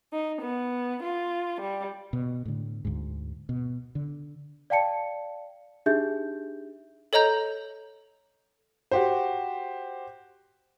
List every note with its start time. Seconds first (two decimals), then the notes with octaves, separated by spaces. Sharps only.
0.12 D#4
0.41 B3
1.02 F4
1.60 G3
2.13 B2
2.45 A2 D3
2.85 D2 G#2
3.49 B2
3.95 D3
4.70 D5 F5 G5 A5 C#7
5.86 D4 D#4 G4 G#4 E5 G6
7.13 A4 C#5 D#5 A#5 G6
8.91 F#4 G4 C5